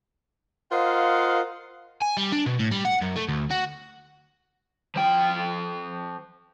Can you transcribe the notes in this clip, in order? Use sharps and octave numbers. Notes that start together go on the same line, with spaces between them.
F4 A#4 C5 D#5 F5 F#5
G#5
G3
D4
B2
A2
G3
F#5
F#2
A3
D2
F#4
F3 G5